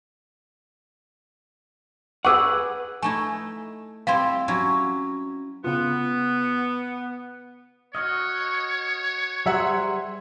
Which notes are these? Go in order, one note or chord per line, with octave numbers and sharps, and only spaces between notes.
G#4 B4 F#5 C#6 D6 E6
A3 D#4 E4 G#5
G3 C4 E4 F5 C6
F#3 C#4 E4
C#3 B3 F4
F#4 C#5 D#5 C#6 D#6 F6
G3 F#4 G#4 C5 E5 F#5 A#5